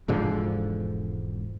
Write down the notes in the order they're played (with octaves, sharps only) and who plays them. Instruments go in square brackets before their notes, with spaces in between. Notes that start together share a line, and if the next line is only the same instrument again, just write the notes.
[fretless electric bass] E1 G#2 D3 F3